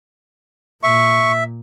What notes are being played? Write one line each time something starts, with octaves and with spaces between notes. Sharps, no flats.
A#2 E5 C#6